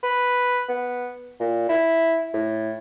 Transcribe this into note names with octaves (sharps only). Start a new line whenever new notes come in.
B4
B3
A#2
E4
A2